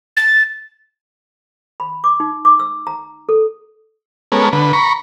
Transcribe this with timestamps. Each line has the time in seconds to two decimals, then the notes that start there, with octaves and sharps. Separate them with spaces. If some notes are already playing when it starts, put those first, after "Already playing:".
0.17 A6
1.80 B5
2.04 D6
2.20 D#4
2.45 D6
2.60 E6
2.87 A#5
3.29 A4
4.32 G#3 B3 C#4 A4 A#4
4.53 D3 B4
4.73 A#5 B5 C#6